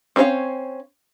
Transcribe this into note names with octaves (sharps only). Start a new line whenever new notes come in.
C4 C#4 G#4 C#5 F5